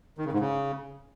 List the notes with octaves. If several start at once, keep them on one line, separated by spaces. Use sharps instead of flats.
D#3
C#3
G#2
C#3